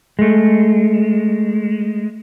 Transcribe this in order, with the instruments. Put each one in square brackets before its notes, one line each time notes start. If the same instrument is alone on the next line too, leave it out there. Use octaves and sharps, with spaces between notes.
[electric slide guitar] G#3 A3